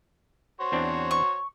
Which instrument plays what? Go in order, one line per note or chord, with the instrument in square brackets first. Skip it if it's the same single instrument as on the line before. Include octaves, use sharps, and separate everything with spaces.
[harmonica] F#4 C5 C#5
[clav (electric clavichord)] E2 C4 D4
[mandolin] C#6